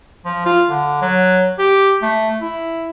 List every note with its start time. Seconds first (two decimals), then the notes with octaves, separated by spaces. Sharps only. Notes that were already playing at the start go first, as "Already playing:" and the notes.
0.25 F3
0.46 F4
0.70 D3
1.02 F#3
1.59 G4
2.02 A3
2.41 E4